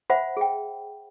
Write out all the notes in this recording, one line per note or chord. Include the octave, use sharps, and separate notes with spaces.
C5 E5 F#5 B5
G#4 G5